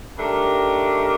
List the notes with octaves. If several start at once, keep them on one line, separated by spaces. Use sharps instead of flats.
D#3 A3 D4 G4 A#4